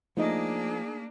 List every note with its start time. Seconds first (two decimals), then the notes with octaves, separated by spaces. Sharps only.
0.17 F3 A3 A#3 D4 D#4 G#4 D#5